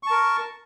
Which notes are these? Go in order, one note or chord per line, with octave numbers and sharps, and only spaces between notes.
A#4 A5 C#6